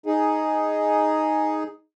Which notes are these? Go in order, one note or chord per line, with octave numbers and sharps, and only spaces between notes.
D#4 G#4